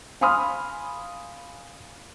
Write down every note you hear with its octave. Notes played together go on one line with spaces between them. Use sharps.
F5 G#5 B5 C6 D#6 F6